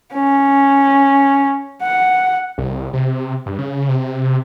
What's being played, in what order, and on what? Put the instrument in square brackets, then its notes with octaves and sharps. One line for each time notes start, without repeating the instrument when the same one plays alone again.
[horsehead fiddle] C#4
F#5
[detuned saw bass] C2
C3
G2
C#3
C3